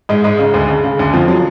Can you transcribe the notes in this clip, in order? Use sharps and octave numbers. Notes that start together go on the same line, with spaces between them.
G#2 G#3
G#2 G#3
C#3
D2 D3
C#3
C#3
D2 D3
F2 F3
F#3